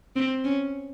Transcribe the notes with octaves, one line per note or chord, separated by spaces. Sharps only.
C4
C#4